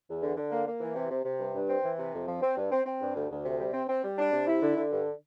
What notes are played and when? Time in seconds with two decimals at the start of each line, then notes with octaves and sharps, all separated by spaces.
0.08 E2
0.22 D3
0.37 D3
0.51 A#3
0.67 A#3
0.81 E3
0.96 C3
1.11 C3
1.25 C3
1.39 G2
1.55 G2
1.69 C4
1.84 E3
1.99 C3
2.14 F2
2.28 F3
2.42 C4
2.57 G2
2.72 C4
2.86 C4
3.00 G2
3.16 D2
3.31 D2
3.45 C3
3.60 G3
3.74 C4
3.89 C4
4.04 G3
4.18 D4
4.33 C3
4.47 E4
4.62 D3
4.76 D3
4.92 G2